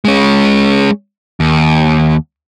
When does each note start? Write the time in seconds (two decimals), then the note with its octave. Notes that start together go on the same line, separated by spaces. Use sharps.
0.05 G#3 C#4
1.40 D#2